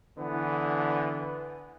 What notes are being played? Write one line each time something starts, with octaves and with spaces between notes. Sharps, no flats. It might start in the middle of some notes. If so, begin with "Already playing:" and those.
D3 E3 B3